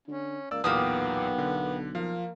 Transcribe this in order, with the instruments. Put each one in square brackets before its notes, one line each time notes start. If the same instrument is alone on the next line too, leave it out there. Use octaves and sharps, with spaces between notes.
[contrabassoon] D3 [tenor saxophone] C#4
[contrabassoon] C#2 [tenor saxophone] A#3 [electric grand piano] D5 E6
[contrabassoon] B1 [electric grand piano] E2 A#2 [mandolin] A#3 G4 D#6 [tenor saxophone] B3
[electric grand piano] D3
[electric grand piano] F3 F5 [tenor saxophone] A#3